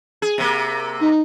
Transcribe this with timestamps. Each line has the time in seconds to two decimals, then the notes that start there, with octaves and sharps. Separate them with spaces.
0.22 G#4
0.38 C3 A#3
1.01 D#4